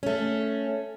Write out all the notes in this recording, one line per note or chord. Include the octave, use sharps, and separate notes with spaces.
A3 C#4